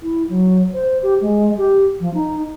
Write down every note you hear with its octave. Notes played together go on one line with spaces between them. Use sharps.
E4
F#3
C5
G4
G#3
G4
F3
D#4